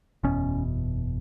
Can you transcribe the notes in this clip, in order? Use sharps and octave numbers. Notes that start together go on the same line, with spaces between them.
F#1 E2 B2 C#4